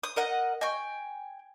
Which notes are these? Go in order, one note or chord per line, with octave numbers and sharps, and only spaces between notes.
D#6
A#4 D#5 F#5
D#5 G5 G#5 C#6